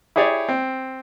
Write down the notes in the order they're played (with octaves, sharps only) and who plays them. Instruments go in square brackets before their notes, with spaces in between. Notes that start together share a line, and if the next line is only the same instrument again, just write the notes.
[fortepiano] E4 G4 G#4 C#5 D5
C4